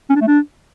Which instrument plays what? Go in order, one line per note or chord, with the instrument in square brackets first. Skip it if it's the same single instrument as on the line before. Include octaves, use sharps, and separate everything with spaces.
[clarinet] C#4
D4
A3
D4